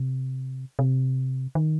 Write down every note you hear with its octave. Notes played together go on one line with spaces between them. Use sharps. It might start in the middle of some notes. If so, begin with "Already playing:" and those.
Already playing: C3
C3
D#3